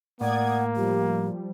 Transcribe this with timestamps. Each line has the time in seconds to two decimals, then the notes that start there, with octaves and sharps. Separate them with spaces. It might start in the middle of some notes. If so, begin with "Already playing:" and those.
0.21 A2 A#3 D5 F#5 D#6 G#6
0.76 F3 G3 G4